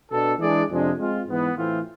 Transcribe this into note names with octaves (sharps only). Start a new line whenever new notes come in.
B2 B3 D4 A4
E3 G#3 D4 G#4 D5
F2 C3 F3 G#3 D4
G#3 C4 F4
G#2 E3 B3
A2 E3 A3 C4 F4